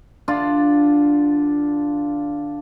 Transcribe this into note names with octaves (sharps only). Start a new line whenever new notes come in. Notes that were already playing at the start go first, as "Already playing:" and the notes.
D3 D4 F4